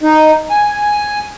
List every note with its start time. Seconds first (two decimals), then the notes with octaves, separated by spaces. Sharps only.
0.01 D#4
0.50 G#5